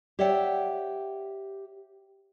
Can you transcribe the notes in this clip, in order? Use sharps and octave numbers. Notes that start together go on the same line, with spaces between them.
G4 C#5 D5 E5 F#5 G5